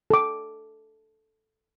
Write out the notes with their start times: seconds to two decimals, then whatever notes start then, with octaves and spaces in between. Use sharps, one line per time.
0.10 A4 D6